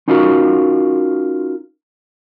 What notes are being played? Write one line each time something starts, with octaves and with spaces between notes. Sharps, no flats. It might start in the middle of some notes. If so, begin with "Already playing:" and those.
C#4 D#4 F4 F#4 A#4